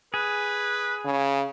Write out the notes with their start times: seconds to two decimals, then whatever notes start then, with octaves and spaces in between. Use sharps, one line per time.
0.14 G#4 B4
1.05 C#3